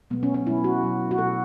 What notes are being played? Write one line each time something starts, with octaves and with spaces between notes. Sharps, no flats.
B2 F#3 A3 B3
C#4
C#4
B2 F#3 A3 E4
F#4
B2 F#3 A3
F#4
B2 F#3 A3 A4